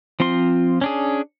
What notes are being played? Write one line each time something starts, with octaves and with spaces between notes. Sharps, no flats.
F3 C4 F4 C6
C#4 D4 G#4